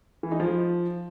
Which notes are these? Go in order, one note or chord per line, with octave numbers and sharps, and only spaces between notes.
E3
D#4
F3